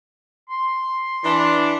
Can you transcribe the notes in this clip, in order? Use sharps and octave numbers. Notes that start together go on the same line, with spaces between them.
C6
E3 D4